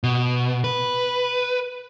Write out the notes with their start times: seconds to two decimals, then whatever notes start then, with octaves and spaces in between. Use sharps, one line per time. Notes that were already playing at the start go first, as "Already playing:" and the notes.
0.04 B2
0.64 B4